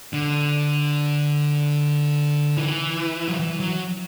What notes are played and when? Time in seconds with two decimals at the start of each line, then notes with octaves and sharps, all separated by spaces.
0.13 D3
2.57 E3
3.28 F#3
3.39 E3
3.60 F#3